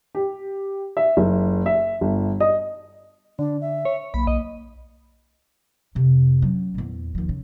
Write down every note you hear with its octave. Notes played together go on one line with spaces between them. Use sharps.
G4
E5
F#1
E5
G1
D#5
D3 D4
E5
C#5
B1 A#3 B5
B1 D#5
F2 C3
F#3 C#4
E2 A#2
D#2 F3
C#3